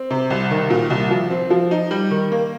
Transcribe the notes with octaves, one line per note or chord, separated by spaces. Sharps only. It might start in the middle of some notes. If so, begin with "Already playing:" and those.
Already playing: C4
C3
C2
D#3
A#2
C2
F3
C4
F3
D#4
G3
D#3
A#3